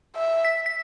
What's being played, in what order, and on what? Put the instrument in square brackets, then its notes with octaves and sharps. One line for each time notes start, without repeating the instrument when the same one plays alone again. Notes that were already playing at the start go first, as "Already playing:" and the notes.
[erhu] E5
[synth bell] B6
B6